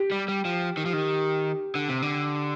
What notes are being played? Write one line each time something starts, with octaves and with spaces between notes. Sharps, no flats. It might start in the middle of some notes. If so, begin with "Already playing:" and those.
Already playing: G4
G3
G3
F3
D#3
F3
D#3
D3
C3
D3